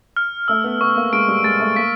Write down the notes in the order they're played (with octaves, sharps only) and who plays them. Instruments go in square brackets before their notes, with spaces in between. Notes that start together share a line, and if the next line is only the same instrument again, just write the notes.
[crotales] F6
[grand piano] A3 [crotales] E6
[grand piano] B3
[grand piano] B3 [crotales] C#6
[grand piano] A#3
[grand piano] G#3 [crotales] D7
[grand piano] G3
[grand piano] G#3 [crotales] A6
[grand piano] A3
[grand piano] A#3 [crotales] B6